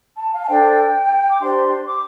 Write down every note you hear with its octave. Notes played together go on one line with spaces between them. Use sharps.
A5
F5
A5
D4 A4 C5 G5
D6
D4 G4 C5 C6
D6